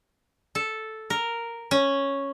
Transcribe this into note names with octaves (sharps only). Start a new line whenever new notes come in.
A4
A#4
C#4